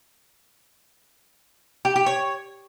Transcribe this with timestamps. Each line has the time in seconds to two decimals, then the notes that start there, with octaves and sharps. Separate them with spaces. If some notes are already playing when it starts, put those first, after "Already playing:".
1.85 G4
1.96 G4
2.06 C#5